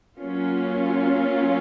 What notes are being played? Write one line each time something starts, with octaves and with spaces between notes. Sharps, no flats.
F#3 A#3 C#4 F4